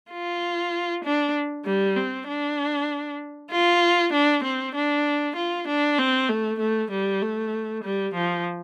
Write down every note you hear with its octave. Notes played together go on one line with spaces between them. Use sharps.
F4
D4
G3
C4
D4
F4
D4
C4
D4
F4
D4
C4
A3
A3
G3
A3
G3
F3